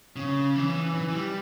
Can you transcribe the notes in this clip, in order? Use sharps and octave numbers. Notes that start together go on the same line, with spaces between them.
C#3
E3
E3
E3
G3